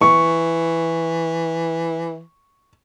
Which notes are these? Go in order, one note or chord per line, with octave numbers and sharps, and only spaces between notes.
E3 C#6